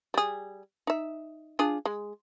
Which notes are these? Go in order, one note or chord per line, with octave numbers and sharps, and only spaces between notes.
G3 G#4
D#4 E5
D4 F4 G#4
G#3